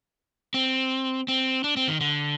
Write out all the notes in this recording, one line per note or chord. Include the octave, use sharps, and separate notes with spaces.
C4
C4
D4
C4
D#3
D3